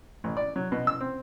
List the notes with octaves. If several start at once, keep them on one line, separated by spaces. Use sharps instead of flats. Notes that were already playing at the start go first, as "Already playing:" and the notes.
A1
D5
F#3
B2
E6
C4